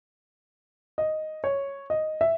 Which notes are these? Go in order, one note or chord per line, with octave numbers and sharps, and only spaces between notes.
D#5
C#5
D#5
E5